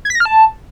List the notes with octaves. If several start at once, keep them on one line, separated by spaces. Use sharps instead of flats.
G#6
B6
A#6
F6
A5